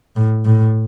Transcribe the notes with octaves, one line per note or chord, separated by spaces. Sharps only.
A2
A2